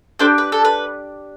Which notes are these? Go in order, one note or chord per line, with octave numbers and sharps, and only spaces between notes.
D4 G4 A4 C5
B4
A4
B4